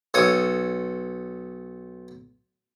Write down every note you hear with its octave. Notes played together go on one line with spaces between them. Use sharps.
B1 A4 C#5 D#6